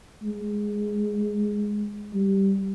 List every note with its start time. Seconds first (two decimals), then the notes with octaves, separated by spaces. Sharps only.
0.23 G#3
2.14 G3